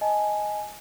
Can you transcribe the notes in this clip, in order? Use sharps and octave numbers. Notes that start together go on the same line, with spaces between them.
D#5 G#5 A5